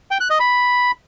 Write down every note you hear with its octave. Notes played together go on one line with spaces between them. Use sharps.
G5
F#6
D#5
B5